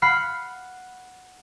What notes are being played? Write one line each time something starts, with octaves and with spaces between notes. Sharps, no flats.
F5 F#5 B5 F6 C7